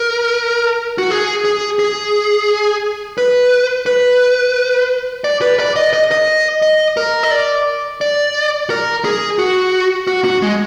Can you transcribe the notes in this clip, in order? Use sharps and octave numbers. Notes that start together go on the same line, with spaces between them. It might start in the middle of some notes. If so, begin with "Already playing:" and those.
Already playing: A#4
F#4
G#4
G#4
G#4
B4
B4
D5
B4
D5
D#5
D#5
D#5
D#5
A#4
D#5
D5
D5
A#4
G#4
F#4
F#4
F#4
G#3